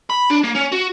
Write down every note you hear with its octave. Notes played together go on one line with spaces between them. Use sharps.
B5
D4
A#3
C#4
F#4